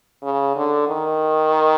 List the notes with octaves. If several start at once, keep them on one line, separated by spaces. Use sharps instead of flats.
C#3
D3
D#3